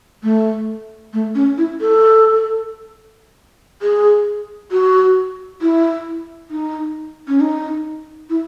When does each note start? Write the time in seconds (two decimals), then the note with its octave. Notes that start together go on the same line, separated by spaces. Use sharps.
0.23 A3
1.13 A3
1.35 C#4
1.58 E4
1.81 A4
3.82 G#4
4.72 F#4
5.61 E4
6.50 D#4
7.28 C#4
7.40 D#4
8.30 E4